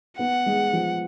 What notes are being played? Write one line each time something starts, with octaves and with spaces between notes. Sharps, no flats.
B3 F#5
G#3
F3